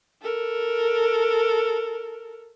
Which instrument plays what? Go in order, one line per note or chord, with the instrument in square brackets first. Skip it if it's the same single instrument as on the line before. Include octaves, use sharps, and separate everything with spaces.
[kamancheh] A4 A#4